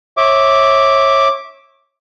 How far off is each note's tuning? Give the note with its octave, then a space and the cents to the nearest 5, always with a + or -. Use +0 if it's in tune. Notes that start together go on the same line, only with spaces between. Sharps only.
C#5 -25 E5 -15 D6 +0